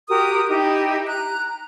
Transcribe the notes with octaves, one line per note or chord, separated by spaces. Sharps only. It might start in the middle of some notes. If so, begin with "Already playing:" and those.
F#4 G4 A#4 D#6
D#4 E4 G4
A#5 F#6